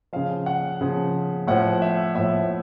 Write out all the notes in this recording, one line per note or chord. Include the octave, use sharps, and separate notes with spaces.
C#3 F3 F5
F#5
C#3 F3
A2 F3 F#5
E5
A2 F3 E5